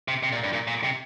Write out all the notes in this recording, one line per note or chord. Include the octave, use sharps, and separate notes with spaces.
C3
C3
A#2
G2
A#2
A#2
C3